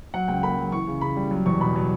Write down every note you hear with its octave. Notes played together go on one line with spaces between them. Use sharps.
F#3 F#5
C#2 G5
A#3 B5
F#3
E3 C#6
C#3
C#3 B5
G3
F#3
E2 C#6
B2 B5
F#3